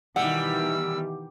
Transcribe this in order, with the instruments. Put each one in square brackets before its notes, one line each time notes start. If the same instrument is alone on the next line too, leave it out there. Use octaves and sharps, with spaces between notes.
[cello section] B2 D#3 E3 [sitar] G3 [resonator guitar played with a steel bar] F#5 [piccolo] E6